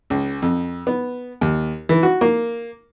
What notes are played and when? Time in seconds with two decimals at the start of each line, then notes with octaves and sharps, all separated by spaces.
0.10 C#2
0.42 F2
0.87 B3
1.41 D#2
1.89 E3
2.03 F#4
2.21 A#3